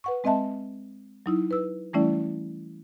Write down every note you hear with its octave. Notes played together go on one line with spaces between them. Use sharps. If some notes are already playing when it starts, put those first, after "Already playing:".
B4 F#5 C#6
G#3 C4 D#5 E5 A5
F#3 D#4 E4
B4 E6
E3 G3 A3 C#4 E4 D5